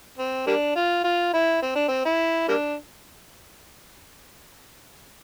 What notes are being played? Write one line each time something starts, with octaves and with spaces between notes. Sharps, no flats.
C4
G3 A#3 D4
F4
F4
E4
C4
D4
C4
E4
G3 A#3 D4